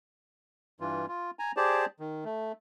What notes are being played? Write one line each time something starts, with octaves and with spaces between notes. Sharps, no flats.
G2 E3 F4
F4
G#5 A#5
G4 G#4 C5 D5 A5
D#3
A3